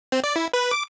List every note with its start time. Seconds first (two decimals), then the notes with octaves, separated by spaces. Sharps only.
0.12 C4
0.24 D5
0.36 E4
0.53 B4
0.71 D6